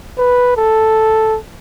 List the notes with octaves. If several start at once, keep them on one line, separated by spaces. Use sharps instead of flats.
B4
A4